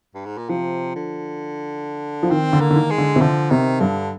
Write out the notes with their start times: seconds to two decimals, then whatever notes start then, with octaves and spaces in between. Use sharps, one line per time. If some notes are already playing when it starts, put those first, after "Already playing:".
0.15 G2
0.26 G#2
0.38 A#2
0.49 C3 F3
0.96 D3
2.23 F3
2.30 D#3 C4
2.53 D3
2.61 A#3
2.71 D3
2.76 D#3
2.91 G#3
2.98 D3
3.16 C3
3.21 D3 F3
3.50 C3 D#3
3.80 G2 D3